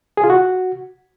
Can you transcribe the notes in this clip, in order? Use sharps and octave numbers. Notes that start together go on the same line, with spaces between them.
G#4
F4
F#4